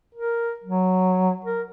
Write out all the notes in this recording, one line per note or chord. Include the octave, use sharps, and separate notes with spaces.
A#4
F#3
A#4